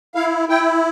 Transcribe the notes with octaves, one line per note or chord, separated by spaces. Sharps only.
E4 F5
E4 G5